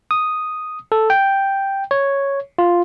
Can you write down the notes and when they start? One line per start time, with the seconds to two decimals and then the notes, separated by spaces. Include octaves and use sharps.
0.11 D#6
0.92 A4
1.10 G5
1.91 C#5
2.58 F4